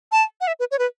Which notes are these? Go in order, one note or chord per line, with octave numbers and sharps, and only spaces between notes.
A5
F#5
E5
B4
C#5
B4